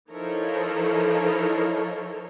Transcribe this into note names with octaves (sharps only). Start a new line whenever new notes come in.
F3 D#4 E4 A4 A#4 C#5